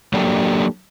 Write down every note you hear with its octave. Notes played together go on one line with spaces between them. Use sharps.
F#3 A#3 D4 G4 A4 A#4